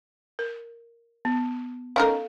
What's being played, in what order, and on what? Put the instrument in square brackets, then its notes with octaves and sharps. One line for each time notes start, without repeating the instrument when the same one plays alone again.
[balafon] A#4
B3
[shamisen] C#4 D#4 A#4 [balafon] A4 F5